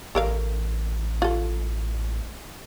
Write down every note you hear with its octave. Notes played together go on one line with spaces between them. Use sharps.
A1 A4 A#4 F5
F4 A4